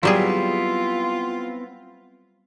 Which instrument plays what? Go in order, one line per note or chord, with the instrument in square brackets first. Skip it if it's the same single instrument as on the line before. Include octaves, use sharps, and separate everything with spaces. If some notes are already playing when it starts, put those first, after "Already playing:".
[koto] F#3 G3 G#4 [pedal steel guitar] B3 C4 E4 [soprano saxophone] F4